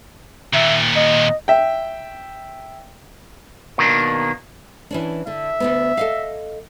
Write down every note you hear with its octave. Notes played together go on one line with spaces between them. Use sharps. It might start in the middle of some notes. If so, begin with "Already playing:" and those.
D#2 A#2 E5
D#5
E5 G5
B2 D#3 A#3 D4
E3 C#4 D4
D3 E5
D2 G#2 B3
A4 D#5 F5